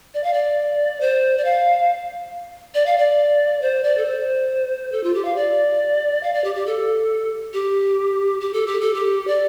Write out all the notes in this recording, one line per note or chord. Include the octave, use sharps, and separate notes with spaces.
D5
F5
D5
C5
D5
F5
D5
F5
D5
C5
D5
A4
C5
A4
F4
G4
F5
D5
F5
D5
G4
G4
A4
G4
G4
A4
G4
A4
G4
D5